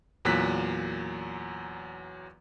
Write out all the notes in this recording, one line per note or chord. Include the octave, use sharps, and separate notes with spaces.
E2 A#2 F#3 F#6 B6